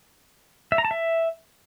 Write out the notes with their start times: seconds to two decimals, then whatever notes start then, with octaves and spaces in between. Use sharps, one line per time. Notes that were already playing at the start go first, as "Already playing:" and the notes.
0.72 E5
0.78 A#5
0.85 A5
0.91 E5